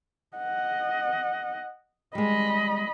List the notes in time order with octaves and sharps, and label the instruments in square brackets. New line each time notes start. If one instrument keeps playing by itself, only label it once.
[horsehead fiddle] D#5 F#5
[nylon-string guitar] G3 G#3 [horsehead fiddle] D#5 B5